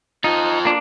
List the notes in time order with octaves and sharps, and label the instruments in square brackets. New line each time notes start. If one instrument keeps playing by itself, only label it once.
[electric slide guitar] D#4 [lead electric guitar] F4 A4
[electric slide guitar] A#3 D4